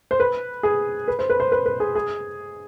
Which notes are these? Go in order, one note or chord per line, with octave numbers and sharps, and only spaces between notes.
C5
B4
G#4
B4
C5
B4
C5
B4
B4
G#4
G#4